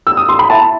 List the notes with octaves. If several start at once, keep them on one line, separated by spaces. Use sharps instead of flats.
E6
D#6
C6
B5
E4 A5